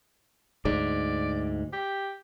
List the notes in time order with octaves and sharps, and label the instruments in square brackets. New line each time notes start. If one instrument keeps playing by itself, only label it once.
[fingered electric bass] D2 G#2 [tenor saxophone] D5
[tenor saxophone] G4